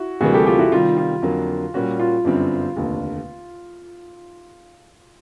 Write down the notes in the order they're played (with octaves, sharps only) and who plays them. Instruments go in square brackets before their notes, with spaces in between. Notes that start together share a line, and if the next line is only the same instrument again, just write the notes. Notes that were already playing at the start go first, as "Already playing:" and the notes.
Already playing: [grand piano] E4 F#4
[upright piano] D2 C3 E3 G3 A#3 [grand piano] F#4 G#4
[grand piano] G4 A4
F4 G4
E4 F#4
[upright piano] C3 D#3 G3 [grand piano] F4
[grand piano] F4
[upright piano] F2 D3 F#3 A#3
A#2 G3 A#3 C#4 F#4
[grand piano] F4
[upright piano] G1 F#2 D3 G3 C4
F1 D#2 D3